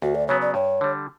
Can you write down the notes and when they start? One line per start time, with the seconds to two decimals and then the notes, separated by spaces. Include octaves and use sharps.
0.02 D2 F#4
0.15 D5
0.28 C#3 F#3 B3 C#5
0.42 D5
0.54 G2 C#5
0.81 D3 G3